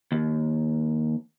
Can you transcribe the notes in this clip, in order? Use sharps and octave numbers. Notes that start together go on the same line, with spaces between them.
D#2